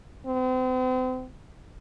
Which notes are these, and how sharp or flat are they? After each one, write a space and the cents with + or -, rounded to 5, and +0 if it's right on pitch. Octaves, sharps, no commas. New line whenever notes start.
C4 -40